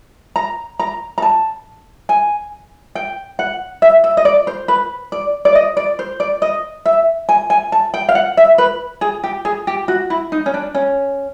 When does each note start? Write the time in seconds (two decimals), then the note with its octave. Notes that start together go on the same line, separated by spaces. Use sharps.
0.36 A#5
0.79 A#5
1.18 A#5
1.22 A5
2.09 G#5
2.95 G5
3.39 F#5
3.82 E5
4.04 E5
4.17 D#5
4.25 D5
4.47 C5
4.68 B4
5.12 D5
5.45 D5
5.55 D#5
5.77 D5
5.99 C5
6.20 D5
6.42 D#5
6.86 E5
7.29 G#5
7.50 G#5
7.72 A5
7.94 G5
8.09 F5
8.15 F#5
8.37 E5
8.58 B4
9.01 G#4
9.24 G4
9.45 G#4
9.67 G4
9.88 F#4
10.10 E4
10.32 D#4
10.46 C#4
10.54 D4
10.74 C#4